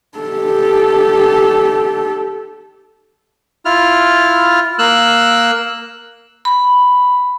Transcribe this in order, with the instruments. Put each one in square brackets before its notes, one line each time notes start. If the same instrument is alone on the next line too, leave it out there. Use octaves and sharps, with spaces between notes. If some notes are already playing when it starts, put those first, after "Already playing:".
[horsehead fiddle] G4 A4
[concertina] E4 F4 F6
A#3 E6 F#6
[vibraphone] B5